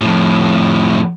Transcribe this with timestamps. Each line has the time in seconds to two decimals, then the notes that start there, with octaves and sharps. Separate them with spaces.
0.01 F2 A2